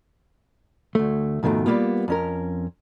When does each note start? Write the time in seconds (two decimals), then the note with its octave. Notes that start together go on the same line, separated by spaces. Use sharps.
0.95 D2 A3
1.43 F2 G#2 B2 D#3 A3
1.66 G3 G#3 A#3 B3 F4
2.08 F2 C#4 A#4